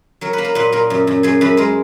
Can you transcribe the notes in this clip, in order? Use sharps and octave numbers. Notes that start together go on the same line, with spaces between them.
F#3 A#4
B4
A#3
A#4
A#2 B4
A#2 A#4
F#2
F#2
F#2 G#4
F#2 B4
G#3 A#4